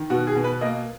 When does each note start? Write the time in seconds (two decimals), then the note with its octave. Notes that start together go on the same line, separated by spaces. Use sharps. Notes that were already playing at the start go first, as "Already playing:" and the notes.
Already playing: D#3
0.10 B2 F#4
0.27 G#4
0.35 B2
0.44 B4
0.61 A#3 D#5